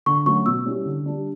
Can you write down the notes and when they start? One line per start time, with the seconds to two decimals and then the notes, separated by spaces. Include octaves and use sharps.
0.06 D3 C#6
0.26 F#3 A3 C#4 F#4 C#6
0.46 B2 E6
0.66 G3 C#4 E4
0.86 D3
1.06 G3 D4